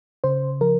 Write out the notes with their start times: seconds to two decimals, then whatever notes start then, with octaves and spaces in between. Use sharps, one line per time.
0.24 C#3 C5
0.61 F3 A#4